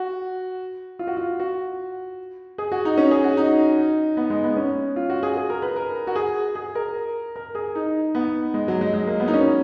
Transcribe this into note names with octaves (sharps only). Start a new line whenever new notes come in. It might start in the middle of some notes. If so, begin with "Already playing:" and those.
Already playing: F#4
F4
F#4
F4
F#4
G#4
F#4
D#4
C#4
G#4
F#4
D#4
B3
G#3
B3
C#4
F4
F#4
G#4
G#4
A#4
B4
A#4
F#4
G#4
G#4
A#4
A#4
G#4
D#4
B3
G#3
F#3
G#3
G#3
A#3
B3
D#4
C#4